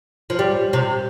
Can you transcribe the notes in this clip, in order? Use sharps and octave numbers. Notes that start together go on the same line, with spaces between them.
F3
G3
C3